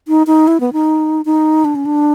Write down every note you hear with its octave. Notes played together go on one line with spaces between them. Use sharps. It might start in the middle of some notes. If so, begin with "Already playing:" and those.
D#4
D#4
E4
B3
D#4
D#4
D4
C#4
D4